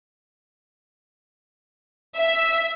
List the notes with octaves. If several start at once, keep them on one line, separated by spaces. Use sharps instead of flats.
E5